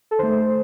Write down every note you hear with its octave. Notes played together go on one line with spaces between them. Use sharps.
A4
D#3 A3 C5